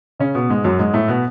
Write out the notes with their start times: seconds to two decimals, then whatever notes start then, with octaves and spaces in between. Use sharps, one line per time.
0.20 C#3 C#4
0.35 B2 B3
0.49 G#2 G#3
0.65 F#2 F#3
0.79 G#2 G#3
0.93 A2 A3
1.08 B2 B3